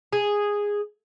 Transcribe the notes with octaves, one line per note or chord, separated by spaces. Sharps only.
G#4